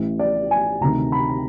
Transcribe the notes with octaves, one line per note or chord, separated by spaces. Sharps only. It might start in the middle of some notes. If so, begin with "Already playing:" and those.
Already playing: A1 A2 E3
D5
G#5
D2 C3 D#3 A#5
B5